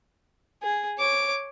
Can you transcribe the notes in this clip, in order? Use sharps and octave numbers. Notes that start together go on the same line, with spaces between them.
G#4
C#5 D6